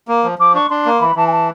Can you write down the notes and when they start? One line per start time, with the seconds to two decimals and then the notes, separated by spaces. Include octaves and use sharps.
0.08 A#3
0.24 F3
0.39 F3 D6
0.54 D4 C#6
0.69 D4 C6
0.86 A#3
1.00 E3 B5
1.16 E3 A5
1.27 G#5
1.31 A5